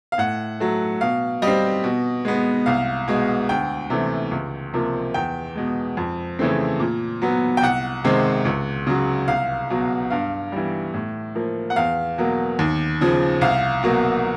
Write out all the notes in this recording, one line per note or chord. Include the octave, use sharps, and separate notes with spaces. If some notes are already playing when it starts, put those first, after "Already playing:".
F5
A2 F#5
F#3 A3
B2 F5
G3 D#5
C4
B2
G#3 B3
C2 F5
B2 G#3
D2 G5
C3 E3 A3
C#2
C3 F3 A#3
E2 G5
B2 G#3
F2
C#3 E3 A3 C4
A#2
F#3 B3
G5
C2 F#5
C3 D#3 G#3 C4
C#2
C#3 F#3
C2 F5
B2 F#3
G2 F5
E3 G3
A2
F3 A#3
F#5
E2 F5
B2 F#3 A#3
D#2
C#3 F3
C2 F5
B2 F#3 A#3